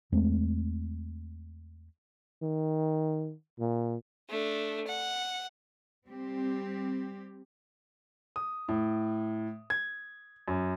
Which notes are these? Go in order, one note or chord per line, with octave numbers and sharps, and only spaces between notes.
E2 G#3 A3 C4
D#3
A#2
A3 D4
F#5
G3 C4 G4
D#6
A2
G#6
F#2